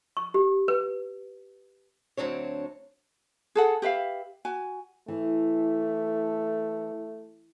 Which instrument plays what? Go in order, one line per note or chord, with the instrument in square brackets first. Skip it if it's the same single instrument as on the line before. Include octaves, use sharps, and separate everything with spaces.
[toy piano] C#6
G4
B4
[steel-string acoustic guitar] D2 F#3 C4 D4 C#5
[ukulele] G#4 A4 F#5
G4 B4 E5 F5
F#4 G#5
[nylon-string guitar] E3 [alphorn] A3